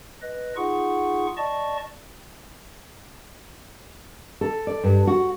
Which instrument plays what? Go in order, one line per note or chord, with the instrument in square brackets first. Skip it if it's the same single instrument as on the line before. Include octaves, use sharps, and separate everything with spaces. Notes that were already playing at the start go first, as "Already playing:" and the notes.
[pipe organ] B4 D#5
D#4 F4 G#4 F#5 C#6
D5 D#5 A5 C#6
[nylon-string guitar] A4
D5
G2
F#4